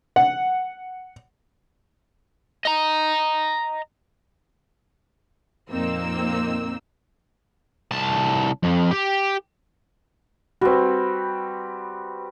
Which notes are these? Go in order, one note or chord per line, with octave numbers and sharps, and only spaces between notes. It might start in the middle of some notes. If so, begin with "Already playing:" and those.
F#5
D#5 A#5
F2 A#2 A#3 C4 D#4 E6
C2 A5
F2
G4
G3 C4 F#4 B4